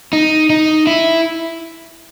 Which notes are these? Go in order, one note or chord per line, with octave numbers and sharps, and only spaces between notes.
D#4
D#4
E4